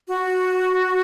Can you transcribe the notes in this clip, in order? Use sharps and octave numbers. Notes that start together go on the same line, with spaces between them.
F#4